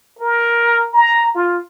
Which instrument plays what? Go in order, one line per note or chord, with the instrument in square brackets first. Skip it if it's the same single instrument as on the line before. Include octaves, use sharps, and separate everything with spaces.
[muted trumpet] A#4
A#5
F4